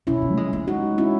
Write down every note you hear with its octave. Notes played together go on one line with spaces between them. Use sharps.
B2 C#4 E4
B2
A3
G#3
G#3
D#4 F#4
C#4 E4